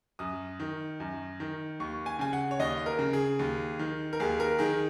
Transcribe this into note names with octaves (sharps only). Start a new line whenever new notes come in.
F#2 D#6
D#3
F#2
D#3
D#2 C#6
G#5
C#3 G#5
F#5
C#5
D#2 D#5
A#4
C#3
G#4
D#2
D#3
A#4
D#2 G#4
A#4
D#3 G#4